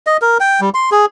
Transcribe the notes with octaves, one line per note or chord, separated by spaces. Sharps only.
D#5
A#4
G5
G3
C6
G#4